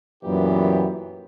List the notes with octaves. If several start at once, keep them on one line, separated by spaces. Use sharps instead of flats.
F#2 A#2 E3 B3 G4